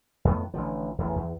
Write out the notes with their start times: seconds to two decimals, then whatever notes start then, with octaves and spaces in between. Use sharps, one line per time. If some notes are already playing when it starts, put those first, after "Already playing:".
0.25 F2 A2 D#3 B3
0.54 A1 D3 F3
0.98 A1 E2
1.16 E2